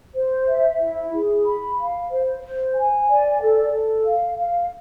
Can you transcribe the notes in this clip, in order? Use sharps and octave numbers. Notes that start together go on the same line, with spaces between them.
C5
E5
E4
G#4
B5
F5
C5
C5
G#5
D5
A4
A4
F5
F5